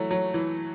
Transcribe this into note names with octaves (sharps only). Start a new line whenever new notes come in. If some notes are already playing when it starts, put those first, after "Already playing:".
Already playing: E3 F#3 A3
F#3
E3